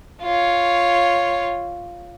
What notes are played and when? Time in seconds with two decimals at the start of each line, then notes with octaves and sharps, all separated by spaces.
0.22 F4 C#5